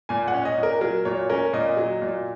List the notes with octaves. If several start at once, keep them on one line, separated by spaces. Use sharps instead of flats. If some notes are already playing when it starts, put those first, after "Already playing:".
A#2 G#5
F#5
C#4
D#5
A#2
A#4
F#3 A#4
A#2 C#5
C#4 A#4
A#2 D#5
F#3
A#2